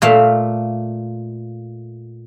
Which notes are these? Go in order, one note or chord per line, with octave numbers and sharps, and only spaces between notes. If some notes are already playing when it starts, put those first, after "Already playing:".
A#2 A3 F5